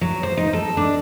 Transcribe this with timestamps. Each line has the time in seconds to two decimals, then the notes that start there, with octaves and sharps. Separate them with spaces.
0.01 F#3
0.23 C5
0.37 D#4
0.53 A4
0.77 D4